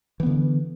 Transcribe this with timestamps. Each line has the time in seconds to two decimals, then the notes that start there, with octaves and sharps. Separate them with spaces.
0.20 E3
0.23 B3
0.26 D3